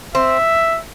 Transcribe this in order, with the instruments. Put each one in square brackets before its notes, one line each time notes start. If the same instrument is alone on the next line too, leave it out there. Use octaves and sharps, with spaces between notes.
[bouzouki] C4 [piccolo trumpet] E5